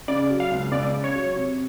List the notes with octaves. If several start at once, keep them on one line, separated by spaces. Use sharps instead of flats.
C#3 D5
F#3
F5
C#2
C#2 D5
C#3
C#5
F#3
C3